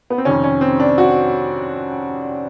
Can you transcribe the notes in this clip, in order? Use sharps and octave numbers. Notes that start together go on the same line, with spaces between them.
B3
C4
F2 C3 D#3 C#4
C#4
C4
D4
F#4